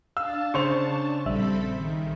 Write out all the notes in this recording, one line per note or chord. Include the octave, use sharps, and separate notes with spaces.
D4 F5 A5 E6
C#3 C5 C#6 F7
A#1 G3 C4 A4 E5 B5
D#3